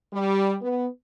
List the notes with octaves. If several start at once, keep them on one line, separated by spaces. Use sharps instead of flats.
G3
B3